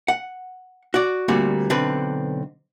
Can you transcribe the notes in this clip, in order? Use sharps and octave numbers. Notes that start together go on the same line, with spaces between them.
F#5
F#4 D5
D2 A#2 G3 C4 F#4
B1 D3 C4 B4